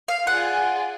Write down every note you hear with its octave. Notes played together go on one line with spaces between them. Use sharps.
F5
F4 G#4 D5 F#5 G#5